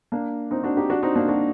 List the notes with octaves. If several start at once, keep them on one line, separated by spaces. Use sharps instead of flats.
A#3 D4
C4 D#4
D4 F#4
D#4 G4
D4 F#4
C4 D#4
A#3 D4
D4 F#4